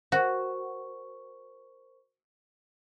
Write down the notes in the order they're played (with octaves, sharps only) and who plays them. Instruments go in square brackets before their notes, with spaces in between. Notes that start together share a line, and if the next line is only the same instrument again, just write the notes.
[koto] F#4 [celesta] A#4 C5 C#6